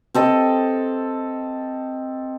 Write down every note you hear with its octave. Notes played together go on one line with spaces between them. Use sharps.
C4 A4 D#5